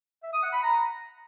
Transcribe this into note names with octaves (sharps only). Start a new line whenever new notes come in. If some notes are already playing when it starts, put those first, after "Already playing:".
E5
D#6
F#5
B5
A#5